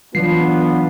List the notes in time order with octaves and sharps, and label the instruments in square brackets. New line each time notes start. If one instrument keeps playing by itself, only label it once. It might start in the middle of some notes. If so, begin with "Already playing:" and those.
[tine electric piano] E3 F#3 C7 [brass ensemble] B3 D4 F4